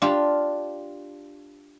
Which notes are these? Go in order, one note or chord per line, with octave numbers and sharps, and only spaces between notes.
D4 F4 G4